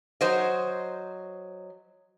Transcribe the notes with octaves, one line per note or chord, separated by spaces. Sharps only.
F#3 C5 D#5